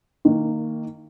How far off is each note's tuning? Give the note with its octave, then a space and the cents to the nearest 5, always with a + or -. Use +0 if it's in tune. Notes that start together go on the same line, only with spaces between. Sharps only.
D#3 +0 A#3 -20